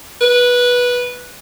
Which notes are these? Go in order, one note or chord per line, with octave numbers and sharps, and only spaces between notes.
B4